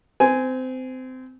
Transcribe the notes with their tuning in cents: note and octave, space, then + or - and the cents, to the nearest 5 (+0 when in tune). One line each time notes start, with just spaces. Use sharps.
C4 -25 G#5 +0